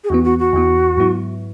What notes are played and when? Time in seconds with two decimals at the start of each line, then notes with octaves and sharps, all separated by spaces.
0.04 G#4
0.09 E2 E3 B3 F#4
0.24 F#4
0.39 F#4
0.53 E2 E3 B3
0.97 G#2 F#3 B3 E4